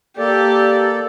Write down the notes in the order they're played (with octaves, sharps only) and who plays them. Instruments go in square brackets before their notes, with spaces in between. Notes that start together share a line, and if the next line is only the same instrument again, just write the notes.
[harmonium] A#3 A4 D5 [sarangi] G4